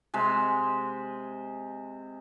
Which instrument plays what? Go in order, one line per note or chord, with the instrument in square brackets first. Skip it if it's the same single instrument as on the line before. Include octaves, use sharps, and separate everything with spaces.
[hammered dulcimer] C3 G#3